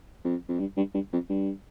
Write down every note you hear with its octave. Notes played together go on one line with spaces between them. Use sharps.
F2
F2
G2
G2
G2
F2
G2